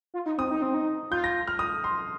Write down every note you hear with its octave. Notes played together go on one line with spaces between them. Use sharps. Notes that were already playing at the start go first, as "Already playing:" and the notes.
F4
D#4
C4 D#6
D#4
C4
D#4
F4 G6
A#6
F6
D#6
C6